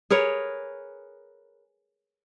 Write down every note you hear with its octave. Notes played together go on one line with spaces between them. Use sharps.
G#4 A#4 B4 C#5